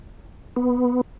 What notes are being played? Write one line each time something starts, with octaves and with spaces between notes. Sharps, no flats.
B3